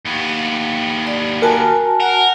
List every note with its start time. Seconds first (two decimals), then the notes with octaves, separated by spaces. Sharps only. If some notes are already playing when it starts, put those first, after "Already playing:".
0.05 D#2 B3
1.07 D5
1.42 F#4 A#4 G#5 A5
2.00 A#4 F#5